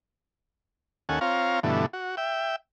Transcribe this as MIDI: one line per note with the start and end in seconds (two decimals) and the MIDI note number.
1.09 1.19 39
1.09 1.19 61
1.09 1.19 69
1.09 1.19 78
1.09 1.19 80
1.21 1.60 60
1.21 1.60 65
1.21 1.60 73
1.21 1.60 77
1.21 1.60 82
1.63 1.86 43
1.63 1.86 47
1.63 1.86 50
1.63 1.86 52
1.63 1.86 57
1.93 2.15 66
2.17 2.56 76
2.17 2.56 79